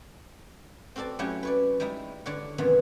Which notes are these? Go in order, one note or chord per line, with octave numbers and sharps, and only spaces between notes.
C4 F#4 A4 D5 A5
F#3 A3 C#4 E4 F#4 G4
B4 C#5 D5
G3 G#3 D#4 E4
D3 C#5 D5 F#5
F#2 C3 D#3 E3 B3